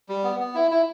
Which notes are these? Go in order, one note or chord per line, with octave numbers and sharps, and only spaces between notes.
G3
B3
B3
E4
E4